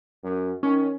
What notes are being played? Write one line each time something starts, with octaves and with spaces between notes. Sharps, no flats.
F#2
D#3 C#4